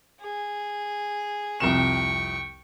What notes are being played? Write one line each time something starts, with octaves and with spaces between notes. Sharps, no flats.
G#4
C2 F2 G5 C#6 E7